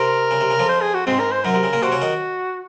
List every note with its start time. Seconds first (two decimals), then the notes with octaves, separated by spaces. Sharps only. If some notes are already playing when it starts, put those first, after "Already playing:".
Already playing: C3 C4 A#4
0.31 C#3
0.41 C3
0.50 C#3
0.59 F2 F3
0.69 C5
0.81 G#4
0.94 F#4
1.07 G#2 G#3 C4
1.20 A#4
1.32 C5
1.45 F#2 F#3 A#4
1.54 C3
1.63 C#3
1.73 A#2 A#3
1.83 C3 C4 F#4
1.92 C#3 C#4
2.02 D#3 D#4